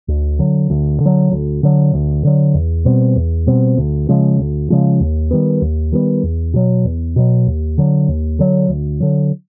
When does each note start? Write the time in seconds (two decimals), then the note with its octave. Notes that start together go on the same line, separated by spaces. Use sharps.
0.08 D2
0.39 D3 F#3
0.70 D2
1.00 D3
1.06 F#3
1.32 D2
1.63 D3 F#3
1.94 D2
2.25 D3 F#3
2.54 E2
2.85 B2 G3 C4
3.16 E2
3.47 B2 G3 C4
3.77 D2
4.09 C#3 F3 G#3
4.39 D2
4.70 C#3 F3 G#3
5.00 D#2
5.31 D#3 G3 B3
5.62 D#2
5.92 D#3 G3 B3
6.23 E2
6.54 B2 F#3
6.84 E2
7.16 B2 F#3
7.47 D#2
7.78 D3 F#3
8.08 D#2
8.39 D3 F#3
8.69 D2
9.00 D3 F#3